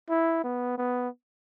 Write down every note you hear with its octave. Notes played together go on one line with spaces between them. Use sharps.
E4
B3
B3